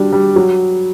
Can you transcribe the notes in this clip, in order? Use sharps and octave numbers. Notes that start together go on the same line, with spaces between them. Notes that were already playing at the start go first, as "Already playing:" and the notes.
Already playing: G3 D4 F#4
G3
F#3